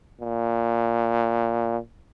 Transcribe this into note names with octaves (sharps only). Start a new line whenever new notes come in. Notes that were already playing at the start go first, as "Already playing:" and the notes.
A#2